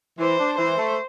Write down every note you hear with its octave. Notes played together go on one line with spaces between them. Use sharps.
E3 C5
D4
E3 C5
A3